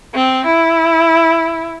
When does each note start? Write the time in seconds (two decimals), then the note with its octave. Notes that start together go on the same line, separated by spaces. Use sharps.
0.15 C4
0.45 E4